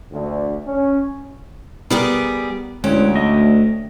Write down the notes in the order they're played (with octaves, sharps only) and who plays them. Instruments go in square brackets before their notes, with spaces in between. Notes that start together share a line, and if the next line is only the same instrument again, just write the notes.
[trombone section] D2
C#4
[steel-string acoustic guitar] G3 G4 G#4 [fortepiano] B3 A#4
[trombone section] D2 [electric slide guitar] G#3 E4 [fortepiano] C#4 [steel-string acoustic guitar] G5
[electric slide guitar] A3 D#5 E5